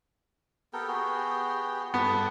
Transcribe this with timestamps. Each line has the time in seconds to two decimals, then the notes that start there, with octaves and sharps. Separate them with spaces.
0.73 B3 G4 A4 A#4
0.88 B3 F#4 G#4
1.94 G2 B3 A4